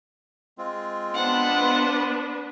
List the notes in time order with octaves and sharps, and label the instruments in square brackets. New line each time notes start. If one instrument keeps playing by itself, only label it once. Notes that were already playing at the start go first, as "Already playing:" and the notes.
[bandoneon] G#3 C4 F4
[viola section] B3 D4 B4 [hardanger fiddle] C5 F#5